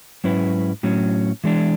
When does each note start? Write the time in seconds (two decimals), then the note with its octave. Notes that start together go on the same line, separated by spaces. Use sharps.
0.24 G#2 F#3 C#4 E4 B4
0.83 A2 F#3 C#4
1.44 E3 G#3 D4